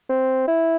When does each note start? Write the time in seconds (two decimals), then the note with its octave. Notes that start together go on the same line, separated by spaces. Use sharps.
0.09 C4
0.47 E4